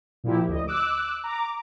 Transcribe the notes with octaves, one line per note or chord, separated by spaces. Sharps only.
A#2 F3 E4 G4
D2 D#5
D6 E6 F#6
A#5 D6